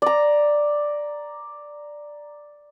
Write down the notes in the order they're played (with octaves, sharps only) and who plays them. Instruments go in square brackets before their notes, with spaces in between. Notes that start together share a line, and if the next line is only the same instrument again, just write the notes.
[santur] D5 A#5